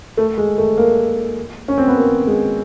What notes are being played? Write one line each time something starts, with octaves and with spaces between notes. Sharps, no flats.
A3
G#3
A3
A#3
C#4
C4
B3
A#3
G#3